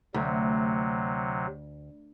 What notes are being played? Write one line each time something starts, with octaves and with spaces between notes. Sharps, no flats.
D2 C3 F#3